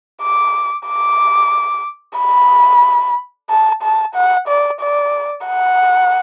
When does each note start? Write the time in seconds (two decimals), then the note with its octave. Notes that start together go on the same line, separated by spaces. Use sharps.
0.22 D6
0.88 D6
2.19 B5
3.50 A5
3.83 A5
4.15 F#5
4.48 D5
4.81 D5
5.47 F#5